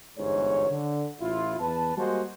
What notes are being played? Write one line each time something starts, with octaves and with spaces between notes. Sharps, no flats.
G1 E2 G#2 C#5
D3
A1 E4 F4
E2 B4 A5
G3 G#3 A#3 F#4 C5